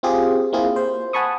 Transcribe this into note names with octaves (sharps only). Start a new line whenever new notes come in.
C4 F4 G4 G#4
A#3 C4 E4 F4 G#4
C5
F#5 G#5 A5 B5 C#6 D#6